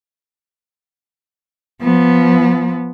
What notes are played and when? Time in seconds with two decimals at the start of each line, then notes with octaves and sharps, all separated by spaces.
1.82 F3 B3